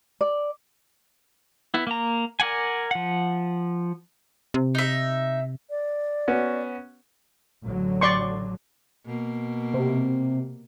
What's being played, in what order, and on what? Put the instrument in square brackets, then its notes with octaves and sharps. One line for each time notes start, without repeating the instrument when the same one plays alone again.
[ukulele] D5
[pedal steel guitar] B3 E4
A#3 A#5
A#4 D5 F#5 G#5
F3 F#5
[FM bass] C3
[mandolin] D#4 E5
[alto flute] D5
[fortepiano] B3 C#4 F#4
[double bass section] A1 D3 F#3
[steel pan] D5 C6 C#6
[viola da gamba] B2 A#3
[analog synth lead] C3